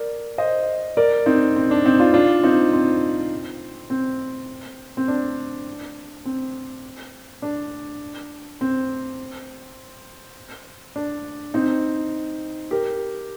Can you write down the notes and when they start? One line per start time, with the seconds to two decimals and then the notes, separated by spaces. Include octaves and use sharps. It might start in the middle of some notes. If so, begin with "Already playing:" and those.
Already playing: A#4 D5
0.38 C5 D#5
0.97 A#4 D5
1.26 C4 D#4
1.56 C4
1.71 D4
1.85 C4 D#4
1.99 D4 F4
2.14 D4 F4
2.43 C4 D#4
2.73 C4
3.90 C4
4.97 C4
5.08 D4
6.25 C4
7.42 D4
8.61 C4
10.96 D4
11.54 C4 D#4
12.71 G4 A#4